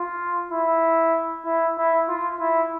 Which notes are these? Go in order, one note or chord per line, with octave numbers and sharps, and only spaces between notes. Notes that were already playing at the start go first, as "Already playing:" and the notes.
Already playing: F4
E4
E4
E4
F4
E4